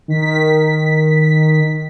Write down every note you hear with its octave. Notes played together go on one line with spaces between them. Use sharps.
D#3 B6